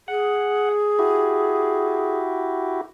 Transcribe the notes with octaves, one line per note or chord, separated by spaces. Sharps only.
G#4 F#5
E4 F#4 G4